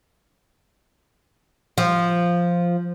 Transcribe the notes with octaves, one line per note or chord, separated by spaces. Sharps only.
F3